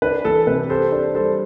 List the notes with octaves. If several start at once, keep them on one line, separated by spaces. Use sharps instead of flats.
D4 B4
E3 A4
C3 B4
G4 A4 C5
D4 A4 C5
G3 A4 C5